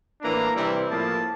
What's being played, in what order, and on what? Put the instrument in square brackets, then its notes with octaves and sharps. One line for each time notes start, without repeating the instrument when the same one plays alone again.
[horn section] A2 E3 A#3 D4 A#5
C3 E3 G3 C4 E4
A2 F3 A#3 E4 A5